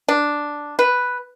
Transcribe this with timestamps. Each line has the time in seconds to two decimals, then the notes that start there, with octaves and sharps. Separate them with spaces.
0.08 D4
0.79 B4